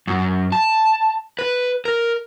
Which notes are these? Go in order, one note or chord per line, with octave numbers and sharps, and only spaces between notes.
F#2
A5
B4
A#4